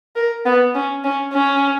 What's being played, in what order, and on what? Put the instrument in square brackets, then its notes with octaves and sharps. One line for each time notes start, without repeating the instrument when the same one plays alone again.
[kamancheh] A#4
B3
C#4
C#4
C#4